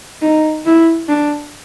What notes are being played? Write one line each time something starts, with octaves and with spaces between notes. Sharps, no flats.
D#4
E4
D4